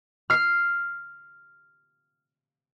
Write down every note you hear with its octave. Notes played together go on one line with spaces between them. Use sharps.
F6 C7